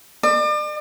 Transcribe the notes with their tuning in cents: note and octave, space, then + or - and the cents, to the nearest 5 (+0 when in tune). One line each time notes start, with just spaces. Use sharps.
D5 +40